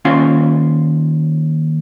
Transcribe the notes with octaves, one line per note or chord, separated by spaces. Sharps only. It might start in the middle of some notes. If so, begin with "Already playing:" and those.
D#2 C#4 F4 F5